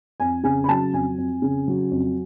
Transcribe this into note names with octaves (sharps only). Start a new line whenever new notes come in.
F2 G#5
C#3 G#5
B5
F#3 A5
F2 G#5
F2
C#3
F#3
F2